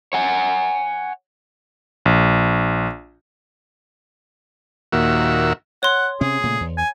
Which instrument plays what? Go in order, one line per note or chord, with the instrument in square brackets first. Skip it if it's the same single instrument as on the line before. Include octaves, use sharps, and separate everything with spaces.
[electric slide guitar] C#5 F#5 G#5
[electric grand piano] A#1
[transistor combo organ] D#2 A#2 F#4 E5
[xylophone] C#5 C6 [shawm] F#5
[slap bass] C3 C#4 [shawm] G#4
[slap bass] A#2 C#3 A3
E2
[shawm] G#5